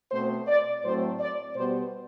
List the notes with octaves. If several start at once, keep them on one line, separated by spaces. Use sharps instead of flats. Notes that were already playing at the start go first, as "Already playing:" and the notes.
B2 A3 C4 C5
D5
A2 F#3 A3 C4 C5
D5
B2 G3 B3 C5